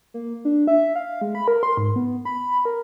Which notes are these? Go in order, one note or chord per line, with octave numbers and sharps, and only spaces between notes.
A#3
D4
E5
F5
G#3
B5
A#4
C6
G#2
B3
B5
A#4